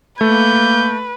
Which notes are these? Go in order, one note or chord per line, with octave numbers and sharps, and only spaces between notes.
A3 A#3 B4 G6